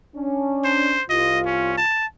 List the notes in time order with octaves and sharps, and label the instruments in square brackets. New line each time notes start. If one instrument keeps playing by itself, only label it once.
[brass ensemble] C#4 D4
[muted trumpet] C5
[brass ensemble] C2 F4 [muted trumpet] D#5
[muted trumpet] C#4
A5